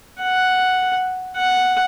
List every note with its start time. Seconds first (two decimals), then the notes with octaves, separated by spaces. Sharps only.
0.20 F#5
1.36 F#5